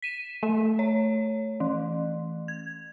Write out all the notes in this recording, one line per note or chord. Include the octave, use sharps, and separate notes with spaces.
B6 D#7 E7
A3
C#5
E3
G#6